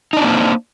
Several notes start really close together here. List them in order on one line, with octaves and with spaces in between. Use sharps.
D#4 D4 C4 A#3 C5